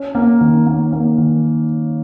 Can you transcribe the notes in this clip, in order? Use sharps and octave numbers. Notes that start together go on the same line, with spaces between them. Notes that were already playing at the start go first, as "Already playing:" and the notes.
Already playing: C#4
A#3
D#3
A#3
A#3
D#3